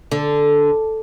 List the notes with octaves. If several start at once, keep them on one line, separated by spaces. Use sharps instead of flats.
D3